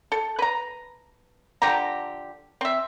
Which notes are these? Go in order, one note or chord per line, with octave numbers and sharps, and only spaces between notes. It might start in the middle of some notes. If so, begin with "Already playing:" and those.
A4
B4 A#5
D3 F3 G4 A#5
C4 E5